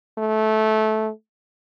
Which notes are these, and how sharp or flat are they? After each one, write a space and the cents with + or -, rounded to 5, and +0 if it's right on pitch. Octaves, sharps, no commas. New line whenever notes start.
A3 -15